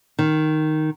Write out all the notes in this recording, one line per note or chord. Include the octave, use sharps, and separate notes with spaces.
D#3